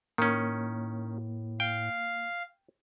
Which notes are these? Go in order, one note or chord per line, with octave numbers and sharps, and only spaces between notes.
A2 D#3 A#3 C#4
F5 G5